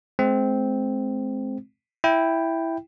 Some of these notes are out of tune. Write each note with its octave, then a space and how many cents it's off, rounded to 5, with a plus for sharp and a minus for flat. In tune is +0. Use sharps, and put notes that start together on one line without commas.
G#3 +35 C4 -5
E4 +0 G5 +0